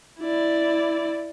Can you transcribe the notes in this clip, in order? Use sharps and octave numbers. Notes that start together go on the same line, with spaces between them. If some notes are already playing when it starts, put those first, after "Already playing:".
E4 D5